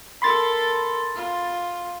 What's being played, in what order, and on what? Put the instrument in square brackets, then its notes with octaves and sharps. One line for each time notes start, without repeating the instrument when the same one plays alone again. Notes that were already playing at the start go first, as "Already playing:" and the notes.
[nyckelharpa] A4 A#4 [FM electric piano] B5 C6 A6
[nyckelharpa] F4